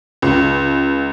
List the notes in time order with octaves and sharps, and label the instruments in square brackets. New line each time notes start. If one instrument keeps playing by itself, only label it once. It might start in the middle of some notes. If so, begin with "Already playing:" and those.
[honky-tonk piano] C#2